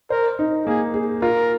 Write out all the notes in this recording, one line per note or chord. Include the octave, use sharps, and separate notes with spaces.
A#4 C5
D#4
A#3 G#4
G#4
F4 A#4